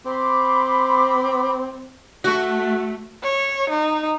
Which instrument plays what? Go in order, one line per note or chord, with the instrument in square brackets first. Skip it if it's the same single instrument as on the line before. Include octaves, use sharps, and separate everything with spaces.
[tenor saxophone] C4 [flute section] B5 C6 D6
[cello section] A3 [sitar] F#4
[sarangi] C#5
D#4